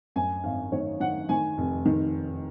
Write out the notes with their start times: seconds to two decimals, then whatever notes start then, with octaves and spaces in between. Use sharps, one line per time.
0.16 F#2 G#5
0.44 G#1 F5
0.72 D#3 C#5
1.00 D#3 F#5
1.29 D#3 G#5
1.57 F1
1.85 D#3